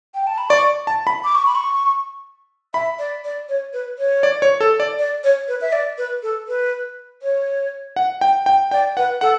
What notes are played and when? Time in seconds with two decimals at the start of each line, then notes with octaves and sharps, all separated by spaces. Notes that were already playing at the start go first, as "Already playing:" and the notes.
0.14 G5
0.27 A5
0.38 B5
0.49 D5 C#6
0.87 A5
1.07 B5
1.24 D6
1.35 C#6
1.46 B5
1.55 C#6
2.74 E5 B5
2.99 D5
3.24 D5
3.49 C#5
3.73 B4
3.98 C#5
4.23 D5
4.42 C#5
4.61 A4
4.80 D5
4.99 D5
5.24 C#5
5.48 B4
5.61 E5
5.72 D5
5.98 B4
6.22 A4
6.48 B4
7.22 C#5
7.96 F#5
8.21 G5
8.46 G5
8.71 D5 G5
8.97 B4 F#5
9.21 A4 F#5